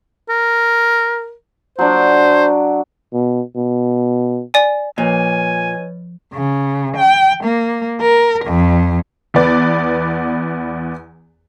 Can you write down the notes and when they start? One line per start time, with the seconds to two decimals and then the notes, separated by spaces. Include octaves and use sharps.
0.29 A#4
1.79 F#3 D4 C5
3.13 B2
3.56 B2
4.54 D5 G#5
4.98 A#2 F3 B4 C#5 D#5 G#5
6.33 C#3
6.97 G5
7.44 A#3
8.02 A#4
8.45 F2
9.34 E2 B3 B4 D5